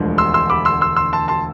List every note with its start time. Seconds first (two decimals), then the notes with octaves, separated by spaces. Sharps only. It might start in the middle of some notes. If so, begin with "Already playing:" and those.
Already playing: E1 D2 D3 F3 G#3
0.18 C6 E6
0.34 C6 E6
0.50 B5 D6
0.65 C6 E6
0.81 C6 E6
0.96 C6 E6
1.13 A5 C6
1.28 A5 C6